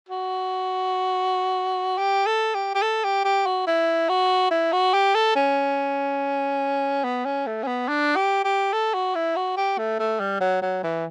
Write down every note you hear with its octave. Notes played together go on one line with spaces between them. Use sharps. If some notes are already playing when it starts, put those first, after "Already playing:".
F#4
G4
A4
G4
G4
A4
G4
G4
F#4
E4
F#4
E4
F#4
G4
A4
C#4
B3
C#4
A3
C#4
B3
D4
G4
G4
A4
F#4
E4
F#4
G4
A3
A3
G3
F#3
F#3
E3